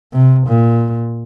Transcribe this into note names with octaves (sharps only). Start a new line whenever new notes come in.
C3
A#2